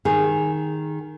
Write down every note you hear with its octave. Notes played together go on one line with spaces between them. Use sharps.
D#3 G#4